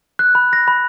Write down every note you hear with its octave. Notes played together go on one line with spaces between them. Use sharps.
F#6
B5
A#6
B5